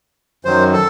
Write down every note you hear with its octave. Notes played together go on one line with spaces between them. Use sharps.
F#2 D#3 F#3 C5
A4